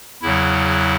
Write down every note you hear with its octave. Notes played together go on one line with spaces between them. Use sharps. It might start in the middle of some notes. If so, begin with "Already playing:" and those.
E2 C#3 F#3 E4